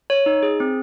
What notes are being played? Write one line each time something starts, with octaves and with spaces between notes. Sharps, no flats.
C#5
D#4
G#4
C4